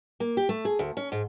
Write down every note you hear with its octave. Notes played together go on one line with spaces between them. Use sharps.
A#3
G4
A3
G#4
D2
C#4
G#2